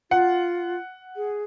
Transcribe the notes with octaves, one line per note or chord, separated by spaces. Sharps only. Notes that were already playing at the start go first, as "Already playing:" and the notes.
F4 F#5
G#4